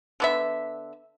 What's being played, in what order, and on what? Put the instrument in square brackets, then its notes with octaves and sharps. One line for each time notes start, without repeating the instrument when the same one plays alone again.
[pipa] D3 B3 E5